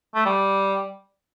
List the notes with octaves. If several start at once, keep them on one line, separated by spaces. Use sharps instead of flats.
A3
G3